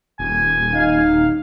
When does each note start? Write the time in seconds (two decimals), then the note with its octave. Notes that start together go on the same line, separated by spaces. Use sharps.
0.19 D#1 G#5
0.74 D#4 F5